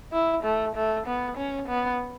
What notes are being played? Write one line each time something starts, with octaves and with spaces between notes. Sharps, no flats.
E4
A3
A3
B3
C#4
B3